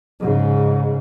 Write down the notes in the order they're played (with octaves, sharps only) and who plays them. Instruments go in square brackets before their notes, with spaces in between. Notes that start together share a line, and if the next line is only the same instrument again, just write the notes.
[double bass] G#2 C#3